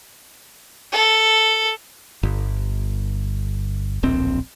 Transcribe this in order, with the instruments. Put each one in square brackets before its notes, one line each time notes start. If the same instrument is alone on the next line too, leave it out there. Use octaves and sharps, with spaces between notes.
[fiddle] A4
[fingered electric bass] G1
D1 A#1 C4